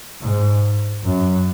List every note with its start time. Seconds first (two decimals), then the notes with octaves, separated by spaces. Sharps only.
0.22 G#2
1.04 F#2